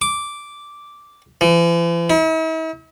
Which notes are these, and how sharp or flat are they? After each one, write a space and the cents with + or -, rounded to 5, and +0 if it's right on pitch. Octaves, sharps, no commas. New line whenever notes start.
D6 -5
E3 +45
E4 -45